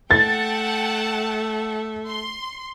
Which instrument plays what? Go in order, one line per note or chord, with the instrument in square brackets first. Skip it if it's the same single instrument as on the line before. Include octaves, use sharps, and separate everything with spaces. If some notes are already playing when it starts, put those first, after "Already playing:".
[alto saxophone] A3 [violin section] F#5 G5 A5 [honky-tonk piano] A6
[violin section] C6